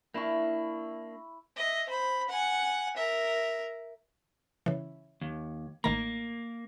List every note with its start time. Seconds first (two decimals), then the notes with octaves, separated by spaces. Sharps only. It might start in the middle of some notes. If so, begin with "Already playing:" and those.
0.14 A#3 D4 E4 C#6
1.56 D#5 E5
1.89 C5 B5
2.29 F#5 G#5
2.97 A#4 E5
4.66 C#3 E3
5.21 D#2
5.84 A1 D#3 A#3 A#5